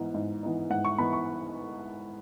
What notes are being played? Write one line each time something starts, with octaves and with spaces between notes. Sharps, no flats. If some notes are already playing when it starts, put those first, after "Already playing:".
Already playing: G#2 E3 B3 D#4
G#2
E3 B3 D#4
G#2 F#5
C#6
E3 B3 D#4 B5
C#6